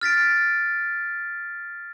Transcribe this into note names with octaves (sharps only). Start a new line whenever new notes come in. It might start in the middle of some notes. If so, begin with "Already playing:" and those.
F6 A6 B6 D7